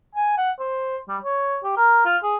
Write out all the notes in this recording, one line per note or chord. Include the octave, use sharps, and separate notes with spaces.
G#5
F#5
C5
G3
C#5
G4
A#4
F4
G#4